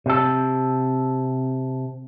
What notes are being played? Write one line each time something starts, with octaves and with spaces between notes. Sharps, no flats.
C3 A4